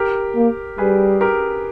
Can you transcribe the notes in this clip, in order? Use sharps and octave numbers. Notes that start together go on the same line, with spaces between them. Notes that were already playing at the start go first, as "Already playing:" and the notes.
Already playing: G4 A#4
A#3
G3 G#4 B4
G4 A#4